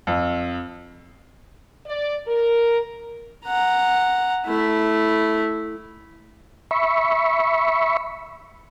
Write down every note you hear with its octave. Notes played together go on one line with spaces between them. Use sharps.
F2
D5
A#4
F#5 A#5
A3 E4
E5 B5 C#6